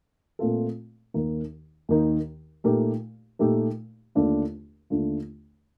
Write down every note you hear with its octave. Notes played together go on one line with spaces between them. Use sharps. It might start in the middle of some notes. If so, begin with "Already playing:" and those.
A#2 A3 C4 F4 A4
D#2 D#3 A#3 D#4
D#2 D#3 A#3 D#4
A#2 A3 D#4 G4 A#4
A#2 A3 D#4 G4 A#4
D#2 D3 A3 D4 F4
D#2 D3 A3 D4 F4